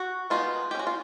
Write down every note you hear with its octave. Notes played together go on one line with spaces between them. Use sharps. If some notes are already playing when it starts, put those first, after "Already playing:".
Already playing: F#4
D#3 G#3 B3 D#4 F4
G#3 C#4 F#4 G4
F4